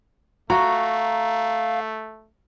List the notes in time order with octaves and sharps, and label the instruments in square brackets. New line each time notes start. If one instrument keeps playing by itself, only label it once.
[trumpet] A3 [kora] F#4 [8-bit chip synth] F5 [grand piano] A#5